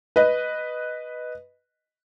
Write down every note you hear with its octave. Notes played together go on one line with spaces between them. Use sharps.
B4 D#5